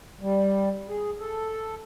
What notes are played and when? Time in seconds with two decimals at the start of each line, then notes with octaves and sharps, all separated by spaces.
0.21 G3
0.89 G#4
1.19 A4